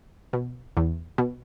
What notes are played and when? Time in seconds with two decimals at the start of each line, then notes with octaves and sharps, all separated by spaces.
0.33 B2
0.77 E2
1.18 B2